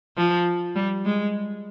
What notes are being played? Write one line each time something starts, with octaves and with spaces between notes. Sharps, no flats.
F3
G3
G#3